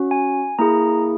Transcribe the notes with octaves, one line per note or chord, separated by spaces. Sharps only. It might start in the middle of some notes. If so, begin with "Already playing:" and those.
Already playing: C#4 F#4
G#5
A#3 E4 G#4 A#5